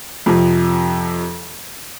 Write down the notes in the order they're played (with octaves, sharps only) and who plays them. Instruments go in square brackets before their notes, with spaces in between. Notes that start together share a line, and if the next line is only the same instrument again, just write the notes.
[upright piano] F2 C3 F3